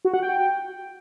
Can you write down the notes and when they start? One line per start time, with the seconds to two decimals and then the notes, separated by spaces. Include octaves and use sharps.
0.05 F#4
0.14 F#5
0.22 G5